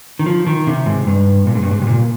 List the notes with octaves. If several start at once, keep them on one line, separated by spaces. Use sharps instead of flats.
D#3
F3
D#3
C3
G#2
G2
A#2
G#2
G2
G#2
C3
A#2